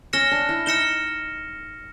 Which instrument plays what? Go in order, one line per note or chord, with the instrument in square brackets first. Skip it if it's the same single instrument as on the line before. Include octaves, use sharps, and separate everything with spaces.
[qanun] C#4 [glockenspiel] F6 A#6 C#7 E7 G7
[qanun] D4
E4
[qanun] D#4 [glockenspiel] F6 A#6 C#7 E7 G7